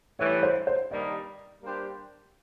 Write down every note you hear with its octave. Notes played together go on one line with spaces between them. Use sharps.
A2 E3 G3 C#5
C5
C5
G2 D#3 G3 A#3 D#4 D5
G3 A#3 D4 G4 C5